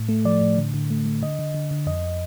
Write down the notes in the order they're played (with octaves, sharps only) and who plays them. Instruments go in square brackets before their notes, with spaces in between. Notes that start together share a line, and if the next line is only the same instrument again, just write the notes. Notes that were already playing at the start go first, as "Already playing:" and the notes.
Already playing: [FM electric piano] A2
A3
F3 D5
A2
D3
D3
A3
A3
D3 D#5
D3
D3
D3
F2 D#5